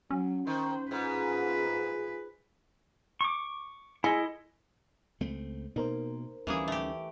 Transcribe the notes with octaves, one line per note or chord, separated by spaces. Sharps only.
F#3 C#4
D#3 C5
G#2 F4 G#4 B4
C#6 D6
G#3 E4 A4 D#5
C#2 A3 C4
B2 A#3 D#4 A#4 C5
D2 E3 G3 A#3 C#4 G#4
A3 G4